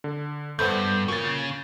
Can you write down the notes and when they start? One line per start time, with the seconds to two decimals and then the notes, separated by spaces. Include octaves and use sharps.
0.04 D3
0.59 E2 G2 A3 B3 C5 B5 G6
1.08 A#2 C#3 C#6 A6